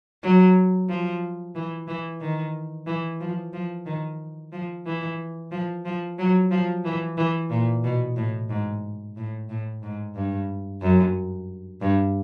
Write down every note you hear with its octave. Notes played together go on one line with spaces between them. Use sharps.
F#3
F3
E3
E3
D#3
E3
F3
F3
D#3
F3
E3
F3
F3
F#3
F3
E3
E3
A#2
B2
A2
G#2
A2
A2
G#2
G2
F#2
G2